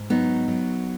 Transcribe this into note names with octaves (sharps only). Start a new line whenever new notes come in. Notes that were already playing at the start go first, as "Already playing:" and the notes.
Already playing: G#2
F#3 B3 D#4
F#3